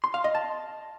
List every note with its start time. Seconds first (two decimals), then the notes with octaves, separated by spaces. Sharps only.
0.04 C6
0.14 F5
0.24 D#5
0.35 A5